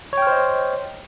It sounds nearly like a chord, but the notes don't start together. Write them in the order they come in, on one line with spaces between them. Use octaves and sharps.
C#5 G5 F6 C5 D#5